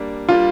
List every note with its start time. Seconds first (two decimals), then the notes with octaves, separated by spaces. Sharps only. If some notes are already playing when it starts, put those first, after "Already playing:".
Already playing: G3 A#3 D4
0.29 G3 A#3 D4 F4